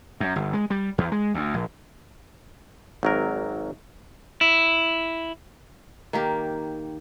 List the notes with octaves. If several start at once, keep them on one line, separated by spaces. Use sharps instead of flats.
F#2
G1
G#3
G3
E2
G#3
D2
A#1
G#1 F#3 A#4
E4
D#3 A#3 G4